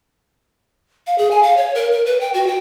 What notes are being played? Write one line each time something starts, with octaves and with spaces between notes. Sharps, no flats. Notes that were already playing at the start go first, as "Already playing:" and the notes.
F5
G#4
G#5
F5
C#5
A#4
A#4
B4
G5
F#4
G5